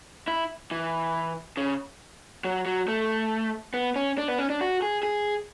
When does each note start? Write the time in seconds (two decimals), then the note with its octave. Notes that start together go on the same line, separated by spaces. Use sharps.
0.28 E4
0.71 E3
1.57 C#3
2.44 F#3
2.66 F#3
2.88 A3
3.74 B3
3.96 C#4
4.18 D4
4.28 B3
4.38 C#4
4.50 D4
4.61 F#4
4.82 G#4
5.03 G#4